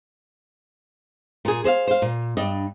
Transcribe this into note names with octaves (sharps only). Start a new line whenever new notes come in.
A#2 G#4
G#4 C5 D#5 F5
C5 F5
A#2
G2 D4 D#5